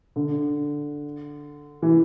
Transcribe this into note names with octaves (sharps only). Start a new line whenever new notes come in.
D3
E3